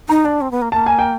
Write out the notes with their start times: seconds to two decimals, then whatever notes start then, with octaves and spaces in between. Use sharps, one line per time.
0.09 D#4 A#5
0.24 D4 A5
0.41 C4
0.51 B3
0.62 A#3
0.72 A#3 A5
0.86 G#5
0.99 G5